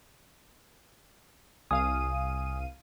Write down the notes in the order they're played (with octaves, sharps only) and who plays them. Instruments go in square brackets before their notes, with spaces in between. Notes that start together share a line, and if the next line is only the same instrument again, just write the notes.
[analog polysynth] C2 F5 D#7 [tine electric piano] G#5 D#6